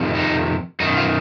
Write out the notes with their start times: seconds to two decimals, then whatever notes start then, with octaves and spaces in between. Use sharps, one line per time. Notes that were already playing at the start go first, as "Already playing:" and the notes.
Already playing: F2 C3 D#3
0.15 D#4
0.80 F#2 D#3 D#4
0.97 F4